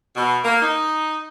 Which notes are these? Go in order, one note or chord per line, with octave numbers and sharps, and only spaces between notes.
B2
A#3
D#4